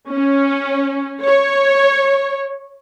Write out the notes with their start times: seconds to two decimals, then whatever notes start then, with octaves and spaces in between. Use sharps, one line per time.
0.11 C#4
1.23 C#5